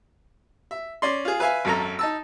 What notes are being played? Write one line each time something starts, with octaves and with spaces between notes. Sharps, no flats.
E5
C#4 D5 C6
F4 G#4
B4 E5 F5 G#5
G#1 F#2 A4 A#5
D#4 A5 E6